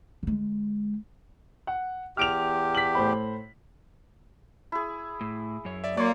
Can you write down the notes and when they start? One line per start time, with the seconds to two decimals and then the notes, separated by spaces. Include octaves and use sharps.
0.23 D3 G#3
1.67 F#5
2.17 E2 G4 F6 D7 F7
2.75 B6 F#7
2.95 A2 C5 B5
4.72 E4 G#4
5.21 A2
5.65 F#2 C#5
5.84 D5 E5
5.97 F#3 A#3 C#5 D5 C6